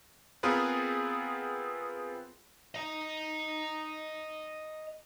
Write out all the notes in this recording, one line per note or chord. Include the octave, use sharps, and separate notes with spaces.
B3 C4 F4 G#4 A#4 B4
D#5 A#5